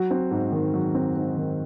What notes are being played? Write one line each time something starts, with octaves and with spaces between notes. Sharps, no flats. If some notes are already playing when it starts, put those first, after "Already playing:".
Already playing: F#3 F#4
C4
G#2
D#3
F#3
C4
G#2
D#3